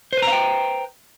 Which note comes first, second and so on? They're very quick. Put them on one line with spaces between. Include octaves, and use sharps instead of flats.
C5 B4 A#5 F5 G5